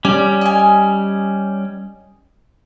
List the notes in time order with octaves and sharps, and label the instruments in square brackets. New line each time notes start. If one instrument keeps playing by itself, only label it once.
[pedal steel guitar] G3 C#4 [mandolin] D5
[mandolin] D#5 G#5